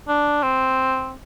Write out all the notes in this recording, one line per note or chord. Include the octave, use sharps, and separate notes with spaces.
D4
C4